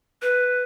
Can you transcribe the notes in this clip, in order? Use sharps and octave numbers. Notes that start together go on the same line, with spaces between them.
B4